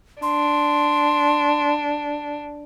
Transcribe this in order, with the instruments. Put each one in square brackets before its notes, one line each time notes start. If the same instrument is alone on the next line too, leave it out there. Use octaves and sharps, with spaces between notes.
[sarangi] D4 [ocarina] C6